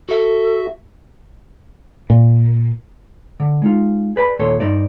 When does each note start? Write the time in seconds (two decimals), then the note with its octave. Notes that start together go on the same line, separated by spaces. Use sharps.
0.09 F#4 A4 E5
2.10 A#2
3.40 D3
3.62 G#3 D#4 F4
4.16 G#4 B4 D5 G#5 B5
4.39 D#2 A#2 A4 C#5 C6
4.60 G2 D#4 C5 D5